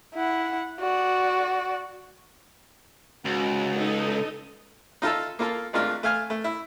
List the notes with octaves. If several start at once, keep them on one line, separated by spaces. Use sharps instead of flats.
E4 F#5
F#4 D5
C#2 G#2 G#3 F#4
D#4 A4 D#5
D#4 F4 A4 E5
A#3 F4 A4
G#1 G#3 A3 D4 F4 A#4
A3 F5 G#5 F6
A3
E4